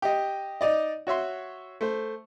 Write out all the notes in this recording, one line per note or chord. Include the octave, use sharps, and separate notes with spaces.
G4 D#5
D#4 D5 D#5
F#4 C#5 E5 C6
A3 C5